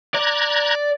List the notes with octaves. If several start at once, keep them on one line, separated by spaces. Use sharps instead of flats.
D5 A#5 F#6 G#6